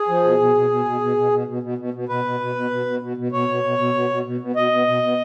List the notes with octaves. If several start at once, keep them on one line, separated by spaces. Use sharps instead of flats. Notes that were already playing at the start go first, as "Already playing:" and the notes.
Already playing: G#4
F3
B2
B2
B2
B2
B2
B2
B2
B2
B2
B2
B2
B2
B2 B4
B2
B2
B2
B2
B2
B2
B2
B2 C#5
B2
B2
B2
B2
B2
B2
B2
B2 D#5
B2
B2
B2